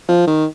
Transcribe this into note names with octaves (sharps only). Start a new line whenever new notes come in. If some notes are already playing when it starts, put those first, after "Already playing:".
F3
D#3